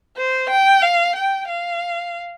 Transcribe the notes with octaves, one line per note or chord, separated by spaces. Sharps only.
C5
G5
F5
G5
F5